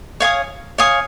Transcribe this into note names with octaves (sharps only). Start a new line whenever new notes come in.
C#5 F5 G#5 D#6
C#5 F5 G#5 D#6